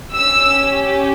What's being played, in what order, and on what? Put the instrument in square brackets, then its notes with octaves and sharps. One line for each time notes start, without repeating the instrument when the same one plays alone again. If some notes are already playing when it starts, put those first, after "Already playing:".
[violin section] C#4 G4 E6